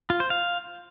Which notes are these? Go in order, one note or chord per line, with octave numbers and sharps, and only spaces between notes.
F4
C5
F5